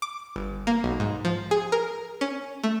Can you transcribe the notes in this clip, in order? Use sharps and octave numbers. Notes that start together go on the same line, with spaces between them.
D6
G1
A#3
B1
G#2
F3
G#4
A#4
C#4
A3